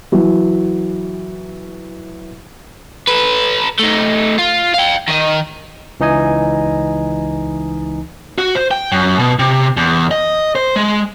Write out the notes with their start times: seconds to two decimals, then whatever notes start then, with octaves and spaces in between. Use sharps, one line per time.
0.12 E3 F#3
3.08 A4 B4
3.80 A3 D#4
4.39 F4
4.74 F5 G5
5.08 D#3 D#5
6.00 C#2 E3 D#4 D#5 G#5
8.38 F#4
8.55 C5
8.71 G5
8.92 F#2
9.19 B2
9.39 C3
9.77 E2
10.11 D#5
10.55 C5
10.76 G#3